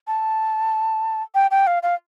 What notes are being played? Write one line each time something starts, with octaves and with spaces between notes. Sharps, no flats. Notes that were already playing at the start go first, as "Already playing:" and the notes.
A5
G5
G5
F5
F5